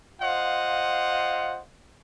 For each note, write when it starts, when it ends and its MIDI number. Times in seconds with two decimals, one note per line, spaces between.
0.21 1.61 65
0.21 1.61 72
0.21 1.61 75
0.21 1.61 77
0.21 1.61 78